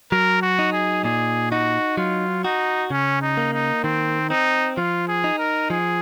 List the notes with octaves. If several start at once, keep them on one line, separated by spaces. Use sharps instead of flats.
F#3 A#4
F#4
D#4
G#4
A#2 G#4
D#4 F#4
F#3 F4
D#4 F#4
C#3 C#4
D#4
A#3
D#4
D#3 C4
C4 D#4
F3 F4
G#4
D#4
A#4
F3 G#4